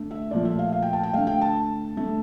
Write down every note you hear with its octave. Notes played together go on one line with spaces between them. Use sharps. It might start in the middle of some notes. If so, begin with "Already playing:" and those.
Already playing: D3 A3
E5
A#2 F3 A3 D5
E5
F5
F5
G5
A5
G5
D3 A3 F5
G5
A5
D3 A3